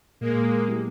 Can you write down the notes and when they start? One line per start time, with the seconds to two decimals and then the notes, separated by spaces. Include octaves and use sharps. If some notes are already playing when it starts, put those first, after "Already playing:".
0.21 A#2 G#3 A#3
0.68 F#3 B3 E4 G4